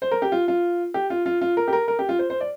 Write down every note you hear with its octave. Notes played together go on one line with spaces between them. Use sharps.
C5
A#4
G4
F4
F4
G4
F4
F4
F4
A#4
G4
A#4
A#4
G4
F4
C5
C5
D5